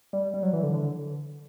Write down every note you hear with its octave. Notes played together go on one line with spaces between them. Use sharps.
G3
G3
F#3
E3
D3
D3